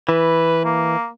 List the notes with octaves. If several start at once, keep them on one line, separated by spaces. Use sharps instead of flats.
E3 B4
A#3